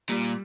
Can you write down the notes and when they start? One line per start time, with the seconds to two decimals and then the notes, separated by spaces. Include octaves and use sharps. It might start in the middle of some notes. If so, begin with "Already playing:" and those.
0.09 A#2 G3